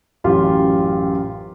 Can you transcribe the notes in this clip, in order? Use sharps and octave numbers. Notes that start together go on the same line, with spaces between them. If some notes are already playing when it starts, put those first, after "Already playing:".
A1 F#2 F4 G4